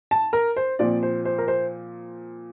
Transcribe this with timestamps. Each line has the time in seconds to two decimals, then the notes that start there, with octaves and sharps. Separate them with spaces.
0.11 A5
0.33 A#4
0.56 C5
0.79 A#2 F3 C4 D5
1.03 C5
1.25 C5
1.38 A#4
1.48 C5